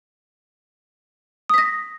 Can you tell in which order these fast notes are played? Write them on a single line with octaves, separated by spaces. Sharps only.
D#6 B6 A#6